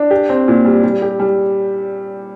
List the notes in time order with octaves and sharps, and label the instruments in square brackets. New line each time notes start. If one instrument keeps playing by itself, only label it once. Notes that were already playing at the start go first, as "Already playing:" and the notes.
Already playing: [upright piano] D4
G4
C4
A#2
G3
G3
G4
G3